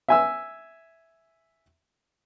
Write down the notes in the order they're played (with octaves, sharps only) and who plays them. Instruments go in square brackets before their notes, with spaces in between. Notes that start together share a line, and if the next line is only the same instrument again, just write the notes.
[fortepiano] E5 G#5 E6